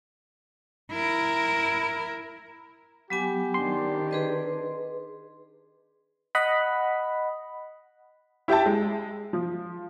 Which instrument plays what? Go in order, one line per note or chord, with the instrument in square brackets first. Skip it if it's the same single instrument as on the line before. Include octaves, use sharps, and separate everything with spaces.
[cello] E4 A#4
[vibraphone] F#3 B3 G#5 [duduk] G4
[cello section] D#3 C4 D4 [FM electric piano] C6
[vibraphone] G#4 B4 D#5
[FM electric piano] D#5 F#5 B5
[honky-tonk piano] E4 G4 E5 G5 A5
G#3
F3